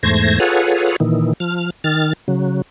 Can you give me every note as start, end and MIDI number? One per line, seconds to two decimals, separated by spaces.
0.03 0.39 40
0.03 0.39 44
0.03 0.39 57
0.03 0.39 72
0.03 0.39 92
0.03 0.39 94
0.40 0.96 65
0.40 0.96 68
0.40 0.96 69
0.40 0.96 71
0.40 0.96 73
0.40 0.96 78
1.00 1.33 46
1.00 1.33 51
1.00 1.33 52
1.40 1.70 53
1.40 1.70 89
1.84 2.13 51
1.84 2.13 89
1.84 2.13 93
2.28 2.62 49
2.28 2.62 54